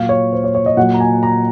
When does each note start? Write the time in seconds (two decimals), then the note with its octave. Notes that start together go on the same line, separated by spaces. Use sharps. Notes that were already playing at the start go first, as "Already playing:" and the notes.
Already playing: A#2 F#3 F5
0.09 C#5
0.33 C5
0.44 C#5
0.55 C#5
0.66 D#5
0.77 A#2 F#3 F#5
0.94 A#5
1.00 G#5
1.23 A#5